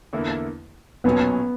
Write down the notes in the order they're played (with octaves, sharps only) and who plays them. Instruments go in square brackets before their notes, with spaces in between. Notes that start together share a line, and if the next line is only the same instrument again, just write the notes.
[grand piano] E2 D3 A#3 E4
[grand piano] B1 A#2 F#3 C#4 [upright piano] B3